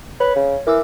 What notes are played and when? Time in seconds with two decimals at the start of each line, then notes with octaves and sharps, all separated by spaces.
0.20 B4 C#5
0.36 C#3
0.67 E3 A#4 D6 E6